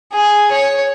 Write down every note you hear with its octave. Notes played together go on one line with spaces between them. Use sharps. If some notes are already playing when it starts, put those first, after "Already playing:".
G#4
C#5